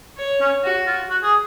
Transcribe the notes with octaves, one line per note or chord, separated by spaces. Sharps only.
C#5
C#4
F#4
F4
F#4
G#4